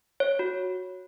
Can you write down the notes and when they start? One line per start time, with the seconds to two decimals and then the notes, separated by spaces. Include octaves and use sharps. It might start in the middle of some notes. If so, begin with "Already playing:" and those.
0.20 C#5
0.39 F#4